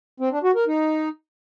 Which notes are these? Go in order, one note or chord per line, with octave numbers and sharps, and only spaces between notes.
C4
D4
F#4
A#4
D#4